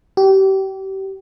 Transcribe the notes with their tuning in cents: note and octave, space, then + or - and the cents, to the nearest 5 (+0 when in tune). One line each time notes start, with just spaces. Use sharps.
G4 -30